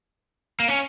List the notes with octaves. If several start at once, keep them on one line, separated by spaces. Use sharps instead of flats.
A#3
C#4